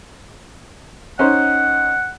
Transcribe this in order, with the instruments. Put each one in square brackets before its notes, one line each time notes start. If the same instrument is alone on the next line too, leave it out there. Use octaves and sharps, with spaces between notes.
[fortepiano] C#4 D#4 C5 [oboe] F#5